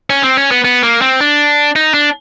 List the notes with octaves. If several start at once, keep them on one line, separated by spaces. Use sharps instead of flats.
C#4
C4
C#4
B3
B3
A#3
C4
D4
D#4
D4